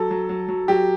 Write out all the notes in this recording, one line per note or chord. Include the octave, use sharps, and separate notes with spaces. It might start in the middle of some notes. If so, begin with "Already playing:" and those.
Already playing: F#3 A4
F#3
F#3
F#3
F#3 G4